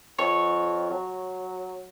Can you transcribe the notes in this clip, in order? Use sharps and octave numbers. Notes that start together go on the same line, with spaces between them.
F2 C#5
F#3